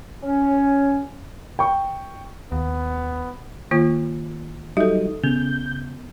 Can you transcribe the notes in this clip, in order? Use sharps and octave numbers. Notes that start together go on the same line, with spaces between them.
C#4
G5 C#6
D#2 B3
D#3 A#3 F4
F#3 G3 D#4 A4 E5 D#6
C#3 B3 G6